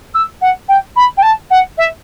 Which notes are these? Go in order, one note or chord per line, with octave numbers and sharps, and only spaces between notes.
E6
F#5
G5
B5
G5
A5
F#5
E5